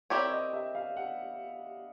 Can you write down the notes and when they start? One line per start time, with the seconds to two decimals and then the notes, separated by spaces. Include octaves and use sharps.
0.10 C4 E4 G4 A#4 C#5 D5
0.31 D#5
0.53 E5
0.75 F5
0.97 F#5